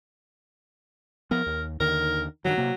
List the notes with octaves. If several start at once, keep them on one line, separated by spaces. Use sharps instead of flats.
F3 B3 A#4
D#2
D#2 D3 D#3 A#4
G2 D#3 F3 F#3
C3 A#3